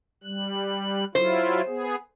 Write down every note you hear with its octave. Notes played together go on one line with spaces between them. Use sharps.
G3 F#6
F#3 E4 F4 C5
B3 G#4